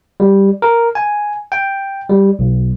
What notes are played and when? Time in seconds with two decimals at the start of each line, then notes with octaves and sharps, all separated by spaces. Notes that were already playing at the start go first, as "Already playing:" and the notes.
0.20 G3
0.62 A#4
0.95 G#5
1.52 G5
2.09 G3
2.39 B1